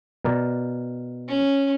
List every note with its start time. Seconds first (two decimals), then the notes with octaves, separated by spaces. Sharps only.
0.25 B2 A#4 D5
1.28 C#4